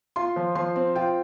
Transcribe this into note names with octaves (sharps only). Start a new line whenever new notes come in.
F4 C6
F3
F3 C6
C4
F4 G5